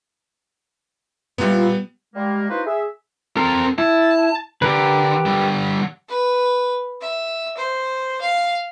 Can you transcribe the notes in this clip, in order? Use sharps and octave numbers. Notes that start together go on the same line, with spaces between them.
A#2 G3 B3 E4
G3 G#3 A#3
A#3 D#4 E4 F#4 B4 C5
G#4 E5
C4 A4 A#4
E4 A5
D3 G4 A#4 B4
D3 G3
B4
E5
C5
F5